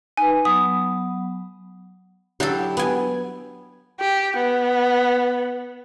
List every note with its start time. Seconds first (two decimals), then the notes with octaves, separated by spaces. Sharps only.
0.17 D#4 B4 G#5
0.45 F#3 B3 D#6
2.40 F#3 D4 E4 G4 A4
2.77 B3 G#5
4.00 G4
4.36 B3